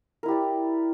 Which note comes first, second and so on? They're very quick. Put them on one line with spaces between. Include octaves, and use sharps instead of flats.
A#4 E4 G4 D5